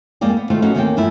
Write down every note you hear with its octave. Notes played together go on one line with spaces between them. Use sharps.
F2 G#3 A#3 D5 G5
B3
D#3 A3 F4 C5
F3 B3 C#4 D#4 F#4 G#4
D2 D#3 A#3 C4 C#4 G5
E2 G2 F3 A3 E4